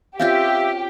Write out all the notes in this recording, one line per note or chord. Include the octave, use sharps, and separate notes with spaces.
C4 C#4 F4 G4 E5 F5 G6